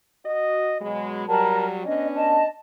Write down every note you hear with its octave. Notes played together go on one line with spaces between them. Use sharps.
F#4 D#5
B2 F#3 G#3 B5
F#3 G3 A#4 A5 B5
B3 C#4 D4 D#5
D#5 A5